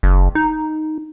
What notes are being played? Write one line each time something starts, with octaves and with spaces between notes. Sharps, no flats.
F#1
D#4